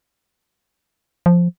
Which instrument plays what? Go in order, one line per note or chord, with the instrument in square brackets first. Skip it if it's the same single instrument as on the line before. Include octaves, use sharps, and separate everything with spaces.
[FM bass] F3